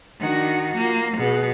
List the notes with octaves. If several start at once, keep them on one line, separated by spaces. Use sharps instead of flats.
D#3 D4 F#4
A#3 F4
B2 G#4